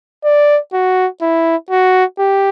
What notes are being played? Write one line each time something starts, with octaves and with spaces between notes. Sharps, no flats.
D5
F#4
E4
F#4
G4